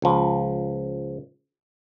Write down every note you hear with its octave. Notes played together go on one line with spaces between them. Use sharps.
C#2 F3